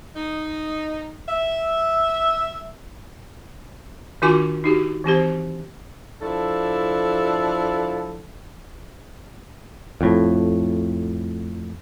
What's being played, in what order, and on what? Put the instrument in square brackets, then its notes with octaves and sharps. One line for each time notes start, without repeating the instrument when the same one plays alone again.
[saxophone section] D#4
E5
[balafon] D#3 D4 F4 F#4 G#5 D6
D#4 F#4 G4
E3 C4 G4 C5
[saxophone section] F3 D4 E4 A4
[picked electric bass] F2 A2